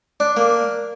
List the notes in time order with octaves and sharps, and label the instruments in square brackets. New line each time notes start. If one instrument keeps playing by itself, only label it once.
[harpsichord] D4
A#3